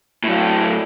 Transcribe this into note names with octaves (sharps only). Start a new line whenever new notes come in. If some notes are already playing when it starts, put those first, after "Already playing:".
A2 F#3